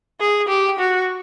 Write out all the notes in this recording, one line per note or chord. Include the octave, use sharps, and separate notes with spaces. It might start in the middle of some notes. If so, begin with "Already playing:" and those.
G#4
G4
F#4